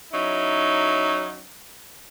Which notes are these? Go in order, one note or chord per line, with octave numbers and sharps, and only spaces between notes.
F#3 C#4 D#4 E4